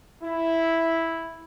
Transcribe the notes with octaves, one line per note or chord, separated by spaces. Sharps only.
E4